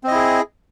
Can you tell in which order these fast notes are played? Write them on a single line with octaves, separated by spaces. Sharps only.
C4 D#5 E4 G#4